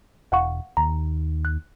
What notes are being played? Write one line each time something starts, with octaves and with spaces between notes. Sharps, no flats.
E1 F5 F#5 C#6
D#2 A#5
F#6